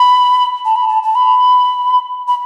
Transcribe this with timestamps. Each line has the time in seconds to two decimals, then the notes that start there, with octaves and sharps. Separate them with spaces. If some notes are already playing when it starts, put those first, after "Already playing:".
Already playing: B5
0.65 A5
0.76 B5
0.89 A5
1.03 A5
1.15 B5
2.28 B5